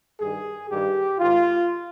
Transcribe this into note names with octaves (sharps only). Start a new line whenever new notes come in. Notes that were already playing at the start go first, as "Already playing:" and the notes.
G2 D#3 G#4
G2 D#3 G4
G#2 D#3 F4